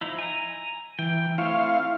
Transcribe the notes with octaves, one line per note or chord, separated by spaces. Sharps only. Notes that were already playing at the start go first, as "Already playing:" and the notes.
F3 D#4 E4
G#5 A#5
E3 G5
A3 C4 E4 C#5 F5